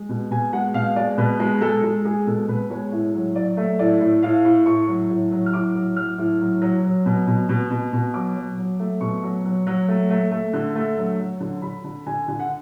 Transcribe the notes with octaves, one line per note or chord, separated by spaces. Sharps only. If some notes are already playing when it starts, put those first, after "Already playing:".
Already playing: G#3
B2
B2 G#5
G#3 F#5
B2 F5
G#3 D5
B2 B4
G#3
G#3 A4
G#3
G#3 G#4
B2 A4
B2 B4
G#3 C#5
A2 C#5
F#3
F#3 D5
A3
A2 D5
A2
A2 F5
A2
A2 C#6
F#3
A2
F#3
F6
A2 D6
F#3
F#3 F6
A2
F#3
F#3
F#3
B2
B2
B2
B2
B2
F#3 D6
F#3
F#3
A3
B2 C#6
F#3
F#3
F#3
A3
A3
A3
D3
A3
F#3
F#3
D3
D3 B5
D3
D3 G#5
D3
F#5